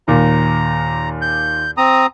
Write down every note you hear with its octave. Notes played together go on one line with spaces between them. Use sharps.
D#2 A#2 A#5
G6
C4 A#5 D#6